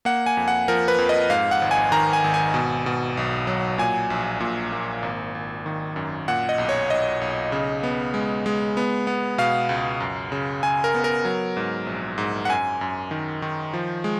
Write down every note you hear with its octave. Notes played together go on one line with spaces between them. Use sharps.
A#3 F#5
G#5
F2
F#5
F3 A#4
B4
F2
D#5
G#2 F5
F#5
G#1
G#5
D#3 A#5
G#5
G#1
G#5
B2
B2
B1
F#3
A#2 G#5
A#1
A#2
A#3
G#1
G#1
D#3
F#2
A#2 F#5
D#5
B1
C#5
B1 D#5
B1
C#3
B3
G#3
G#3
B3
B3
B2 F5
C#2
F#2
C#3
C#3 G#5
A#4
B3
A#4
F#3
G#2
A#1
G#2
F#5
F#2 G#5
F#2
D#3
D#3
F3
G#3